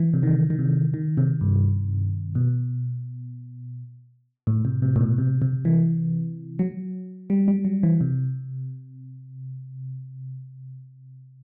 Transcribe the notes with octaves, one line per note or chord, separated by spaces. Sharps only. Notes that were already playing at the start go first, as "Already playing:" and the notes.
Already playing: E3
C3
D#3
D#3
C3
D#3
C3
G2
B2
A2
C3
C3
A2
B2
C3
C3
E3
F#3
G3
G3
F#3
E3
C3